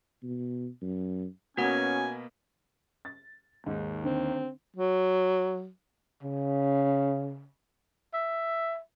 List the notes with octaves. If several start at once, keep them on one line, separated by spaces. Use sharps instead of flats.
B2
F#2
B2 A#3 B3 C#4 F#4 B4 F#5 G#5
A6
D#2 G#2
D3 C4
F#3
C#3
E5